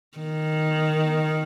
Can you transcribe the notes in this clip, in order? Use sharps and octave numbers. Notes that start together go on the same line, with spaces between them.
D#3